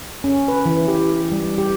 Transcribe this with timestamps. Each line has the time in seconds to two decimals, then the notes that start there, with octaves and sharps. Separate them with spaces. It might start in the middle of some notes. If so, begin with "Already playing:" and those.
0.24 C#4
0.48 B4
0.66 E3
0.88 G4
1.32 G3
1.58 G4